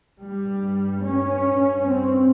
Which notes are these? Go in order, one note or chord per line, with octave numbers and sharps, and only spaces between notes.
G2 G3
C#4
C4